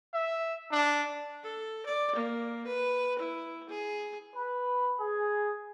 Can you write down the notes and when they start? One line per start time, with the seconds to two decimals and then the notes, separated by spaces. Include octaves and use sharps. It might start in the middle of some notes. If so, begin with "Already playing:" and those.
0.14 E5
0.72 D4
1.43 A4
1.86 D5
2.15 A#3
2.67 B4
3.19 E4
3.69 G#4
4.36 B4
5.01 G#4